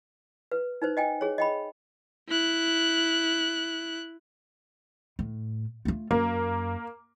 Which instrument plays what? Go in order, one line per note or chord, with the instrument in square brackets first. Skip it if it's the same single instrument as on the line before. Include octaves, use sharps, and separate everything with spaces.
[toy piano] B4
D#4 B4 C5
D#5 G5 G#5
G#4 C#5
D#5 G5 B5
[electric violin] E4 F#6
[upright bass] A2
A3 F4
[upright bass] F#2 [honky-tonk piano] A#3